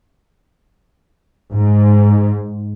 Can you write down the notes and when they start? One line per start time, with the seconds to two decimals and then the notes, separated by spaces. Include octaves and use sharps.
1.52 G#2